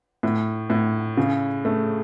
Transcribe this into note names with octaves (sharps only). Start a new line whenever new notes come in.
A2
A2
C#3
A3